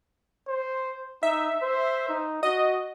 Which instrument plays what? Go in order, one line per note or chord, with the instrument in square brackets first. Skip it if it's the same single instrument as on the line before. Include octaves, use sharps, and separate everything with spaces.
[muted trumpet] C5
[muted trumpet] D#4 [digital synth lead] E5
[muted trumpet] C5
D#4
[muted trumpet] F#4 [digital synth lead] D#5